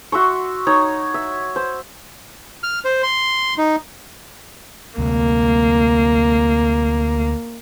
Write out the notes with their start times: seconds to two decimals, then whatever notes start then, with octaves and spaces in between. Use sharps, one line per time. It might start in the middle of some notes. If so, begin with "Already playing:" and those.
0.12 F#4 E5 C6 C#6
0.67 D#4 C#5
1.14 E5
1.56 C5
2.63 F6
2.85 C5
3.03 C6
3.58 D#4
4.98 D2 C3 A#3